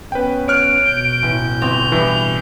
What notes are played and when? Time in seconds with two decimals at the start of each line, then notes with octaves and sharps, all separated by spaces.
0.12 B3 C#4 B4 G5
0.48 C#5 F6 F#6 D7
0.85 B2 G6
1.22 A1
1.62 G1 C4 F7
1.92 G2 E3